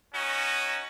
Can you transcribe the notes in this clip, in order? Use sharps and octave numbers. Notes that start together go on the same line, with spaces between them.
C#4 D#4 F#4